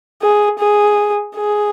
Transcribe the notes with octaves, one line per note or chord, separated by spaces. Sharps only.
G#4
G#4
G#4